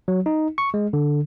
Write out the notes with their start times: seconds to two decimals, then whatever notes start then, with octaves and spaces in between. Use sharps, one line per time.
0.08 F#3
0.26 D#4
0.58 C#6
0.74 G#3
0.93 D3